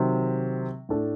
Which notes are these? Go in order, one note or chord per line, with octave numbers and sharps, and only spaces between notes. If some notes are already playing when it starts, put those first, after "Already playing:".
Already playing: C3 D#3 F#3
A2 A3 D4 A4